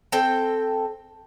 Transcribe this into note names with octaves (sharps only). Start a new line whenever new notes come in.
C4 A4 G5